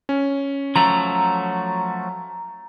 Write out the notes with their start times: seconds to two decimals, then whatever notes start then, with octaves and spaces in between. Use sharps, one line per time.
0.09 C#4
0.76 F3 F#3 A3 A#5